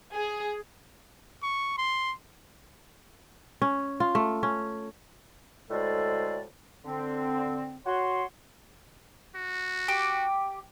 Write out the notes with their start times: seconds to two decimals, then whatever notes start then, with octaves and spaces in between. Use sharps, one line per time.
0.13 G#4
1.43 C#6
1.78 C6
3.62 C#4
4.00 F4
4.15 A3
4.43 C#4
5.70 D2 A2 G#3 A4 C5 D5
6.85 D3 C4
7.86 F#4 C#5 C6
9.35 F#4
9.88 G4